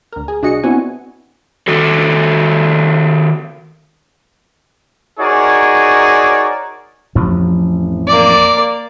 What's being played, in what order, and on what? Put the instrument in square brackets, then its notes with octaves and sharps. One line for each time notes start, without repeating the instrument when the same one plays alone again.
[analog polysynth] D2 A#4
G#4
C2 D4 F#4 G#4 D#5 C#7
B3 C4 D4 E4 F#4 G#5
[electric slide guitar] D#3 F#4 A4
[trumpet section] D#4 F#4 G#4 A#4 C#5 D5
[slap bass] A1 F2 F3
[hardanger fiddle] A#3 D5